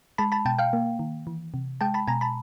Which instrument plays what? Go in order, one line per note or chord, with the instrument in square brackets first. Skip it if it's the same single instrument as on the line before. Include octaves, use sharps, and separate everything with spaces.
[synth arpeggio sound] G#3 A5 B5
A5 B5
B2 G5 A5
F5 G5
A#3
D#3
E3
C3
G#3 G5 A5
A5 B5
B2 G#5 A#5
A5 B5